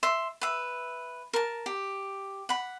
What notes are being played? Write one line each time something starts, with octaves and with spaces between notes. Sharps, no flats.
E5 C6
B4 E5
A#4 A5
G4
F#5 B5